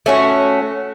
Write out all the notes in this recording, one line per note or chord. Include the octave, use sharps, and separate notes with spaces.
A3 C#4 F#4